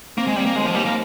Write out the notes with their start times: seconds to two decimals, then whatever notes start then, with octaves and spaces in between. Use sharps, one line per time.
0.17 A#3 C4
0.27 G#3
0.36 G3 C4
0.46 A#3
0.56 D#2 G#3
0.66 F3
0.75 D#2 G3
0.85 A#3